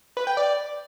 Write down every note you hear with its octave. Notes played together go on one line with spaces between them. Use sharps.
B4
G5
D5